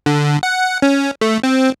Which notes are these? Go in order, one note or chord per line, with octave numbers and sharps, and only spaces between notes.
D3
F#5
C#4
A3
C4